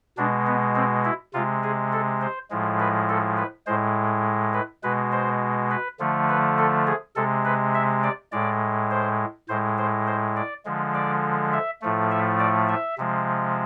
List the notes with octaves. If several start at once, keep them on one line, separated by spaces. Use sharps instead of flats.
B2 G#3 D4
B3
C4
E4
C3 G#3 F4
G#4
A4
C5
A2 F3 G#3
B4
A4
B4
A2 G#3 C5
B4
B2 G#3 B4
C5
B4
D3 F3 A3
B4
A4
G#4
C3 G#3 A4
B4
E5
D5
A2 G#3 D5
C5
A2 G#3 C5
C5
C5
D5
D3 F3 G#3
D5
E5
A2 F3 A3
E5
D5
E5
C3 F3 G#3